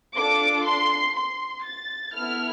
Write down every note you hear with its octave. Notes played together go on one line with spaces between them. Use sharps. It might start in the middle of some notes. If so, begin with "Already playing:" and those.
D4 F4 A4 D6
C6
C6
A6
B3 E4 A4 F6